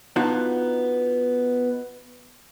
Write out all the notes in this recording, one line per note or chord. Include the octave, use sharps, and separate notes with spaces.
B3 D4 D#4 F4 F#4